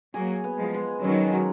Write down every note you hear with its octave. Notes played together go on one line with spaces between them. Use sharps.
F#3 A#3 G#4
B3
F3 G#3
G#3
D#3 F#3 C#4
F#3